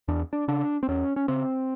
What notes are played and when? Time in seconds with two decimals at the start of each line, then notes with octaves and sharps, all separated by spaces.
0.08 E2 D4
0.33 D4
0.48 C#3 D4
0.83 C4
0.88 E2 C#4
1.16 C#4
1.28 C#3 C4